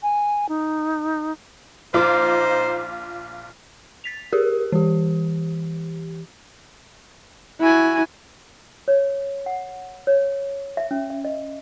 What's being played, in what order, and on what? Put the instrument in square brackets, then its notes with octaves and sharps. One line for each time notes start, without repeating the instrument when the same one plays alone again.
[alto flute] G#5
D#4
[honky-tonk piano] A#1 F4 D6 [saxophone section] D#4 C5
[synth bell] A6 B6 F7
G4 G#4 A#4
E3 G4
[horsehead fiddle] E4 [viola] F#4 G#5
[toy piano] C#5
F#5
C#5
E5
C#4
E5
D#5